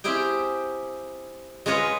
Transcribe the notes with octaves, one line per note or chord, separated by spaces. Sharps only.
C4 E4 G4 G#4 G5
G#3 F4 B4 C#5 D#5